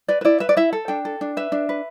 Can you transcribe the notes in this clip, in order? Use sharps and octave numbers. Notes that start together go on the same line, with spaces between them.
B4 D5
B4
E4 D5
B4 E5
D5
E4 E5
A4
D4 G5
A4
D4
B4 E5
D4
B4